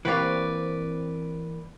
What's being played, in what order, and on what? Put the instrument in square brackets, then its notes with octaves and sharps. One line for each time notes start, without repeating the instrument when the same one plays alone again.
[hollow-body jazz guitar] E3 A#3 [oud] C4 G4 C#5 [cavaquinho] B4 D5